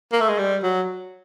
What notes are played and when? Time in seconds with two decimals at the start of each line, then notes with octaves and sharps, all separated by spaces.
0.12 A#3
0.21 A3
0.29 G#3
0.38 G3
0.63 F#3